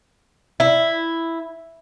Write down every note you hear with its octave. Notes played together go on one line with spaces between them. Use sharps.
E4